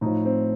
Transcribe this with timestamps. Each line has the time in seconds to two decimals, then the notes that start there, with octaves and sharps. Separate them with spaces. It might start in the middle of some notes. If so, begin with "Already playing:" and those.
0.01 A2 F3 D#4
0.25 C4